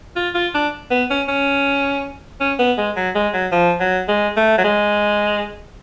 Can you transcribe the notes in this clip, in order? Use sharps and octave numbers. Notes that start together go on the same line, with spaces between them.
F4
F4
D4
B3
C#4
C#4
C#4
B3
G#3
F#3
G#3
F#3
F3
F#3
G#3
A3
F#3
G#3